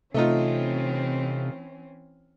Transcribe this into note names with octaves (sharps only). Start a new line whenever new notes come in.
C3 E3 A3 C4 C#4 D#4 F4